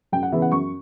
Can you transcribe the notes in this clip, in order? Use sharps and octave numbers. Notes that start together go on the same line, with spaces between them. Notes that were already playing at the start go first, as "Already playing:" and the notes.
F#2 G5
F#5
C#3 E3 B3 E5
F#5
F#2 C#6